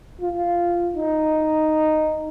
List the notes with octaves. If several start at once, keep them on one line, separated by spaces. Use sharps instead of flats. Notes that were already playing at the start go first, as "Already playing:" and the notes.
F4
D#4